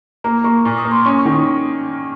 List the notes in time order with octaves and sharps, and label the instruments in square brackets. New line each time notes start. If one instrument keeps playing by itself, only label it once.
[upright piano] A#3 [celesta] A#5
[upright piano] A#3 [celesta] C#6
[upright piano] A#2 [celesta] C#6
[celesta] D#6
[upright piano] A#3
[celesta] C6
[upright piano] C#4 [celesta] C#6
[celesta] C#6
[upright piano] D#3
[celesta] D#6